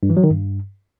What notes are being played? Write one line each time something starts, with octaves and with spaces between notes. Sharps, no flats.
G2
E3
F#3
D#3
G2